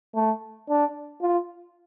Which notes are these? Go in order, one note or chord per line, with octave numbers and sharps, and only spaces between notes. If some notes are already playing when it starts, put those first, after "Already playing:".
A3
D4
F4